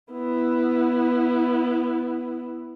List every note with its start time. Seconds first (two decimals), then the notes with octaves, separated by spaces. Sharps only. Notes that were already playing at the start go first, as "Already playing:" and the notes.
0.12 B3 E4